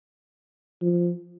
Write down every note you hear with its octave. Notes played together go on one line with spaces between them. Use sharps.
F3